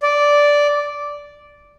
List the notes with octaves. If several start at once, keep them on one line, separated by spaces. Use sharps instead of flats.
D5